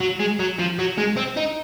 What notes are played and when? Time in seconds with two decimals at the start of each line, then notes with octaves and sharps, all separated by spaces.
0.01 F#3
0.20 G#3
0.39 F#3
0.59 F3
0.79 F#3
0.98 G#3
1.17 C4
1.37 D#4